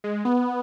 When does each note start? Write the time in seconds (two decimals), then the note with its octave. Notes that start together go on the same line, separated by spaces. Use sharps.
0.04 G#3
0.25 B3